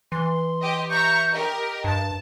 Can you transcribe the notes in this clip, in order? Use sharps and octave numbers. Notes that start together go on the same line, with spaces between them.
E3 C6
G4 D#5
E5 A#5 C#6 G6
G4 A#4 D#5
G2 A5